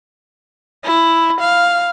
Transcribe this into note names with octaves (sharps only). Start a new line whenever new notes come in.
E4
F5